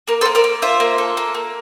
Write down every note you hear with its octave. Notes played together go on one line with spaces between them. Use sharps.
A#3 A#4
A4 C5
A#3
A#4 D5
A#3
F4 C5 E5
A#3
A4
A#3
A#3